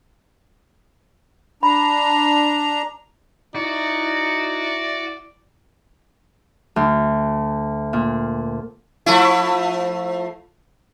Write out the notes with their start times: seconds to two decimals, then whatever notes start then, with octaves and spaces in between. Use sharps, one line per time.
1.63 D4 A#5 B5
3.55 D#4 E4 F#4 D5
6.76 D2
7.93 A#2
9.06 F3 A3 E4